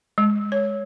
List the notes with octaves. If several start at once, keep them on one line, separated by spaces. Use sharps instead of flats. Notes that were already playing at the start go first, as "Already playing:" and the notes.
G#3
C#5